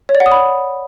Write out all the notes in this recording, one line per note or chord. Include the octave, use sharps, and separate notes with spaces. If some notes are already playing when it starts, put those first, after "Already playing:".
C#5
D5
F#5
D#6
B5